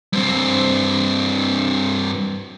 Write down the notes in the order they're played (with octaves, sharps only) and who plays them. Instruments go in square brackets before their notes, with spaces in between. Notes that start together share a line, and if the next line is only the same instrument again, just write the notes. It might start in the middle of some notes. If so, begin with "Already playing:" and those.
[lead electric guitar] G2 C4